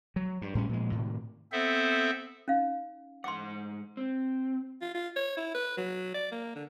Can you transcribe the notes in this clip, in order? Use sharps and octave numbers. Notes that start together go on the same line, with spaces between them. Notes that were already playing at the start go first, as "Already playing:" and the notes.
F#3
G2
A2 G3 C#4
A#2 F3 G#3
A2 C3 D#3
B3 C4 A4 C5 E5
C#4 D#4 F5
G#2 F#5 C6 D6
C4
F4
F4
C#5
E4
B4
F#3
D5
A#3
D3